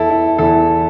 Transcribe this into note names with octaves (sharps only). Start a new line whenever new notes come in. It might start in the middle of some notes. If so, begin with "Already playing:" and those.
Already playing: E2 E3 E4 A4
E4
E2 E3 E4 A4